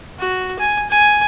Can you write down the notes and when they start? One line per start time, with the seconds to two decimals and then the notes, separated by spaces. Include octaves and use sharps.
0.19 F#4
0.59 G#5
0.90 G#5